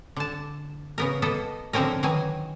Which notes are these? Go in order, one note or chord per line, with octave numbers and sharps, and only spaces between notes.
D3 A5
C#3 B3 A#4
A#3 B3 A4 D#5
D3 F3 F#3 C4 C#4 A#4
D#3 E3 F#3 G#5